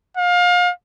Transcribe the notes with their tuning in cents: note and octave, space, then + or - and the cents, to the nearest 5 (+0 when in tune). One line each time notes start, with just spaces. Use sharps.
F5 +30